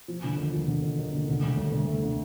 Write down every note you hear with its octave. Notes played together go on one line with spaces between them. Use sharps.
F3
D3
D#2
F3
D3
D#2
D#2
D3
D3
D2
D2
D2
A3
D3